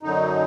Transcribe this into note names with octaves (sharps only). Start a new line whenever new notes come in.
F#2 D3 F#3 D#4